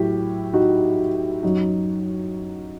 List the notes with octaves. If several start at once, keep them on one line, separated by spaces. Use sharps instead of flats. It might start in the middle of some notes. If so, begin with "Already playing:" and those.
Already playing: A2 F#3 E4 G4
D#4 F#4
F#2 F#3 D#4 F#4